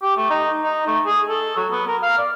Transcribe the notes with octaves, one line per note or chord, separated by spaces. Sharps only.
G4
A3
D#4
D#4
A3
G#4
A4
F#3
B3
A#4
F5
D5